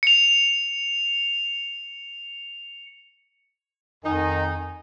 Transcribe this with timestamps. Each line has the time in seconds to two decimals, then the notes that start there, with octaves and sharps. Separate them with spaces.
0.03 C#7 F7
4.04 F2 D#3 D#4 G#5